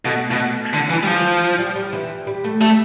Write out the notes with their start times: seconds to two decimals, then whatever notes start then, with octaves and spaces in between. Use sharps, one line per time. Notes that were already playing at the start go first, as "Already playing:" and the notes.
0.05 B2 A3
0.31 B2
0.74 D3
0.90 E3
1.03 G3
1.07 F3
1.58 G3
1.76 G3
1.93 E3
2.27 G3
2.44 A3
2.61 G3 A3